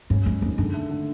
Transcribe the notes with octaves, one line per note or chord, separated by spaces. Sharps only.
G2 C#4
F#2 G#3
F2 D#3
F#2 D3
A3
D3